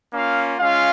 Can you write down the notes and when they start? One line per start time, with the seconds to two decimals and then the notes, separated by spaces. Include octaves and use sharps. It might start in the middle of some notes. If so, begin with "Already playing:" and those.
0.13 A#3 C#4 F4 F5
0.58 G#3 C#4 F4 F5